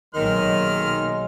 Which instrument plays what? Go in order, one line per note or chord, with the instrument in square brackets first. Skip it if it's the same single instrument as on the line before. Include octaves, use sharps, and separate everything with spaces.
[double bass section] B1 B2 A#3 [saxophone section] D#3 [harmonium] F#3 G#3 [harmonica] C6 F6